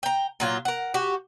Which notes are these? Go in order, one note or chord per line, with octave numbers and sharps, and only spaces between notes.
G5 A#5
A#2 F#3 F4
A#4 F#5
F#4 G4